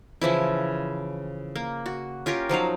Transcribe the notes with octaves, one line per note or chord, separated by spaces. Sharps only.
C#3 E3 F3 E4
A#3
F#4
C#4 F4 G4 A#4
F3 F#3 D#4 F5